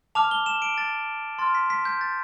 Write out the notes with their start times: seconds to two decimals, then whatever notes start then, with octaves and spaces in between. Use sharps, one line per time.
0.15 A5 D6 F6 F7
0.31 G7
0.46 E7
0.62 D7
0.78 A6
1.39 C6 F6 A6
1.55 B6
1.70 B6
1.85 G6
2.01 A6